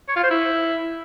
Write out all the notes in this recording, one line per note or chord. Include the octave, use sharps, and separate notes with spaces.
C#5
F4
C5
E4